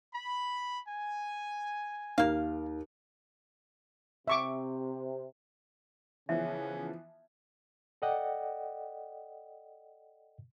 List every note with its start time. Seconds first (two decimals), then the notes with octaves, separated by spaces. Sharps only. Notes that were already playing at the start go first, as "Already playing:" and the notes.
0.13 B5
0.86 G#5
2.18 D#2 A#3 F5
4.28 C3 E5 C#6 D6
6.29 C#3 E3 F3 B3 C#4 E5
8.02 A4 D5 D#5 F#5 G5